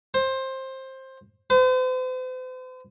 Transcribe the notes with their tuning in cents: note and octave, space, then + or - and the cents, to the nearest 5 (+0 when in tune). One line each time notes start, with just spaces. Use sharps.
C5 +15
C5 -45